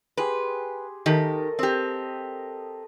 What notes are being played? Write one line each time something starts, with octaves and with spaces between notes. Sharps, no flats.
G4 G#4 B4 C6
D#3 G4 A4 A#4 D#5
C4 G4 D#5